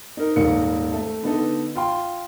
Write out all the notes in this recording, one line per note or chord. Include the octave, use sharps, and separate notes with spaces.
D#4 A#4
D#1 G#2 D#3 A#3 C#7
A3
D3 B3 D#4 A4
F4 G5 C6